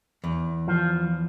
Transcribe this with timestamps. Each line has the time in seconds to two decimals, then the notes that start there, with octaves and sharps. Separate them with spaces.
0.24 E2
0.68 F3